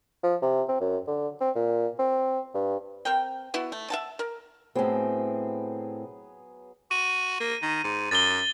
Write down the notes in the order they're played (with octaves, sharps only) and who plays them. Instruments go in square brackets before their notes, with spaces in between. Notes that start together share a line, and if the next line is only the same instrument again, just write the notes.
[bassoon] F3
C3
C4
F#2
D3
C4
A#2
C4
G2
[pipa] C4 A#4 G5
B3 E4 F#4
A3
E5 F#5 A5
A#4
[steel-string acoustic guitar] A2 C4 [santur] F#3 B3 G#4
[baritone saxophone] F#4 [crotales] D#7
[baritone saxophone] A#3
D#3
G#2
[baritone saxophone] F#2 [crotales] A6 G7